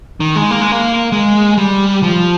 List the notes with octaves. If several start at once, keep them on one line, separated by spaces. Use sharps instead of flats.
D#3
G#3
A#3
G#3
A#3
G#3
G3
F3